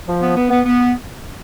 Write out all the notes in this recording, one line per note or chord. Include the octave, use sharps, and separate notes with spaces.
F3
B3
B3
B3
B3